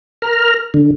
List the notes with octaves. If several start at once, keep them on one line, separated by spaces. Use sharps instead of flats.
A#4 A#5 F6
D3